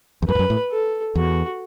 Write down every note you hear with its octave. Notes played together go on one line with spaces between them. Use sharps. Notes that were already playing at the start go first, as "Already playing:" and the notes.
E2
F#2 B4
G2
F#2
A2
A4
E2 F#4